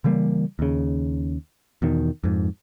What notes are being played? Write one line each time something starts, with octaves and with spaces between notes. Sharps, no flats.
C#3 E3 G3 A#3
D#2 C#3
E2 B2 D#3
F2 G#2